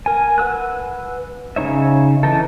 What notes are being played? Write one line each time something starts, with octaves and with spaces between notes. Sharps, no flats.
A#4 G#5
B4 F#5 E6 F#6
C#3 G3 D#4 C#5 E5
E3 D#4 A4